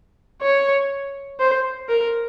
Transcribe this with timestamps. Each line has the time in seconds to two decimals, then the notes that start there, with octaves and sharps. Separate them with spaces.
0.42 C#5
1.40 C5
1.89 A#4